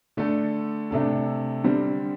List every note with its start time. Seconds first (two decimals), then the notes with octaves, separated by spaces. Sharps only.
0.17 D3 A3 D4 A4
0.91 C3 A3 D4 A4
1.64 D3 G3 C4